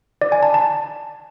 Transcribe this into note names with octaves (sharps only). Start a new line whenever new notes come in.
D5
G#5
A5
A5